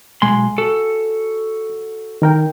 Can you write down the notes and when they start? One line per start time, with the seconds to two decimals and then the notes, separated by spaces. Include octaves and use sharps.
0.22 B1 G#3 G#5 C6
0.58 F#4 A4
2.22 D#3 A#4 G5